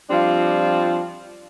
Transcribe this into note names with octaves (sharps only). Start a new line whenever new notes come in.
F3 G3 C4 D4 F4